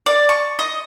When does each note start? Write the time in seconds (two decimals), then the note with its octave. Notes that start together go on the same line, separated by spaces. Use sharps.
0.06 D5
0.29 C#6
0.59 D#5